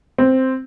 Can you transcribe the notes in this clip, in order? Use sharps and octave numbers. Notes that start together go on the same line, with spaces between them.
C4